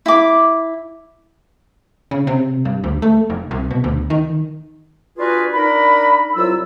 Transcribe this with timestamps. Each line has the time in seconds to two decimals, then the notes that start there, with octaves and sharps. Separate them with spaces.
0.06 E4 D6
2.11 C#3
2.27 C3
2.65 G2
2.84 D2
3.02 A3
3.30 F1
3.51 C2
3.71 B2
3.84 D2
4.10 D#3
5.18 D4 F4 F#4 G#4 B4
5.54 D4 D#4 A#4 B5
6.35 C2 F#3 F4 E6